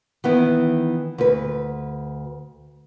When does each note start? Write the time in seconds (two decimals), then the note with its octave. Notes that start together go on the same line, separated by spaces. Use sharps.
0.24 D#3 E3 B3 E4
1.18 D2 B4